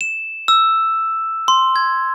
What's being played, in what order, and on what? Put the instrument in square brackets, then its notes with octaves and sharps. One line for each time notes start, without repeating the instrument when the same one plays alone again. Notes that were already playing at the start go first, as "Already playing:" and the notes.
[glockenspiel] E7
E6
C6
G#6